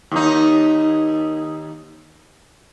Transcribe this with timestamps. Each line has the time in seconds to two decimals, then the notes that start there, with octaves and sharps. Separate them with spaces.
0.11 D#2 D#4